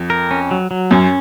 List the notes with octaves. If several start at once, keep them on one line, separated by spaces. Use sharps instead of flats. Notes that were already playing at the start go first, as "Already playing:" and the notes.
Already playing: F2
A#4
C#4
F#3
F#3
F#2 C#4